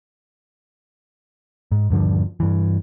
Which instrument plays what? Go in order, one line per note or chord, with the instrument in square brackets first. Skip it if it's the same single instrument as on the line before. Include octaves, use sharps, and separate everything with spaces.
[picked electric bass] G#2
D#1 G2 D3 F3
G2 E3